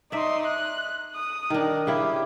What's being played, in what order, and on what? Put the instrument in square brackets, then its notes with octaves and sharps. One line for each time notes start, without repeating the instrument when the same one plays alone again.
[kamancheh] D#4 C6 [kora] D5 E5
[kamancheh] F#6
D#6
[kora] D#3 D4 [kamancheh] A#4
[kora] C#3 E4 [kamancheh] G4